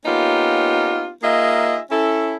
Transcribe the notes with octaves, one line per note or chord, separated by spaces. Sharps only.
A#3 B3 C#4 D#4 F4 G4
A#3 D#4 F4 G#4 D#5 E5
C#4 E4 A4